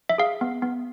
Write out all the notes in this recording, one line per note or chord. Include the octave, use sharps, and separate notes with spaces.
E5
G#4 F5
B3
B3